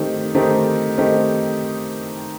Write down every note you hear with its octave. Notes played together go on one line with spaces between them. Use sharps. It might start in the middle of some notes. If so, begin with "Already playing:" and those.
Already playing: D#3 A3 C4 D#4 G4
D#3 A3 C4 D#4 G4
D#3 A3 C4 D#4 G4